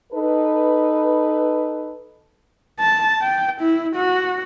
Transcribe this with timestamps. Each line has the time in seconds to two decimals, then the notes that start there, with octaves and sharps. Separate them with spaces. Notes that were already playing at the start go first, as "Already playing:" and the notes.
0.12 D#4 A4 B4
2.80 A5
3.22 G5
3.61 E4
3.96 F#4